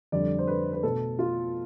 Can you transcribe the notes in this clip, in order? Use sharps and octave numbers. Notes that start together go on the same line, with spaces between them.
F2 D3 G3 D5
C5
B4
B4
B2 A3 A4
F4